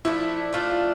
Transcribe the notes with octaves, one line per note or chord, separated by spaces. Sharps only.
F3 A3 D4 E4
F3 A3 D4 F4
F4